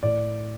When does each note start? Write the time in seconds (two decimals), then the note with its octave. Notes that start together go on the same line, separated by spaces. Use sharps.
0.03 A2 D5